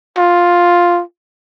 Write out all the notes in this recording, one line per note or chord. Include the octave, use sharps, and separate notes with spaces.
F4